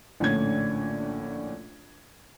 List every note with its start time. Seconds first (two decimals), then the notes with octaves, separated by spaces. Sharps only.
0.20 A#1 A2 D3 C#4 G#6